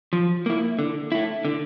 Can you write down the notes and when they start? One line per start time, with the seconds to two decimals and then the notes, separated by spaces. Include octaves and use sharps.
0.13 F3
0.46 A#3 E4
0.79 D3
1.12 A3 E4
1.45 D3